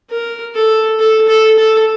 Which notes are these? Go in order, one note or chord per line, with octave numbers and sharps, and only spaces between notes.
A#4
A4
A4
A4
A4